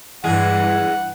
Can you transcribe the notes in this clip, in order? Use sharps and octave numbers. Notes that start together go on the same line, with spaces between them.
E2 G2 E3 G#3 G#4 F#5